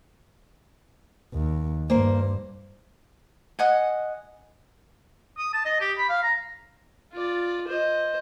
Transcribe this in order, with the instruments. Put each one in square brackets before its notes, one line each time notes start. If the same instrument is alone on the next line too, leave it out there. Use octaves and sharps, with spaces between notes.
[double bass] D#2
[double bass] G2 [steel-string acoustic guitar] A#3 C5
[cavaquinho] D#5 F#5 G#5
[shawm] D#6
A5
D#5
G4
B5
F5
A#5
[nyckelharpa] F4 D5
C5 D#5